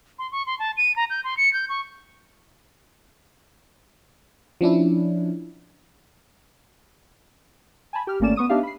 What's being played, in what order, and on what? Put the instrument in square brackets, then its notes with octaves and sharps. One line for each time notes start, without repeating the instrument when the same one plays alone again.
[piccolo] C6
C#6
C6
A5
D#7
A#5
G6
C6
C#7
G6
C#6
[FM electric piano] F3 C#4 D4 E4
[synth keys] G#5 A5 B5
G4 F6
G#1 A3 A#3 C#4 D5 E7
B3 C#6 D#6 D#7
B3 D4 D#4 G4 E5 F5
B5 C7